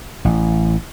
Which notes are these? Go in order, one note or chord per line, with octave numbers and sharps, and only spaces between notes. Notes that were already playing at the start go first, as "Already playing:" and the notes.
A1